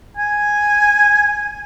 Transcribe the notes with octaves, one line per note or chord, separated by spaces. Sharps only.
G#5